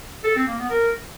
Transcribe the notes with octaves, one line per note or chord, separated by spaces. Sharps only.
A4
C4
A#3
B3
A#4